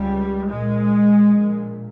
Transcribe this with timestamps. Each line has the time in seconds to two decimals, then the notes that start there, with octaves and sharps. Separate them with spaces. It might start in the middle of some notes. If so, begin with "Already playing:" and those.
Already playing: C#2 C#3 G3
0.49 A#1 A#2 G#3
1.27 A#1 A#2